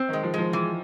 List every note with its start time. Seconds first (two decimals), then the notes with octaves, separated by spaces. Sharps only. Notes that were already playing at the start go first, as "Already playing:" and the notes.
Already playing: C4
0.09 D#3
0.13 G#3
0.23 F3
0.34 F3 G#3
0.53 E3